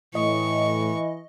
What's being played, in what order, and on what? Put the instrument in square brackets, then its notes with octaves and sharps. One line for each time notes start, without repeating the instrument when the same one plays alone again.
[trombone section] A2 [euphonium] E3 [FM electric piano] D#5 [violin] C#6